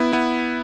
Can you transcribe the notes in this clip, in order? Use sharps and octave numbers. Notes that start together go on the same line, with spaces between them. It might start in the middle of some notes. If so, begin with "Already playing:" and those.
Already playing: B3 E4
B3 E4